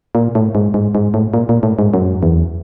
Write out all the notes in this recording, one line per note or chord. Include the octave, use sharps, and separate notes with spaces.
A#2
A2
G#2
G#2
G#2
A2
A#2
A#2
A2
G#2
F#2
E2